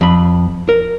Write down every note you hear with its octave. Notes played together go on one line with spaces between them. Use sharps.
F2 B5
A#4